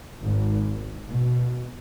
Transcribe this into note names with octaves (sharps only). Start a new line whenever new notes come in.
G#1
B2